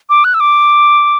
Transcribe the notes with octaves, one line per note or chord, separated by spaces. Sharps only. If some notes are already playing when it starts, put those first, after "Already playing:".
D6
F#6
E6
D6